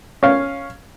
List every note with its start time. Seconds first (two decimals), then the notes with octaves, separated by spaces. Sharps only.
0.23 C#4 F5